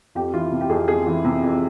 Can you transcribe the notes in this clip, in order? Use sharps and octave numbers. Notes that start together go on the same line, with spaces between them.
F2 G4
E3 F4
C3
G4
F2 G#4
F2 G#4
E3
C3
F2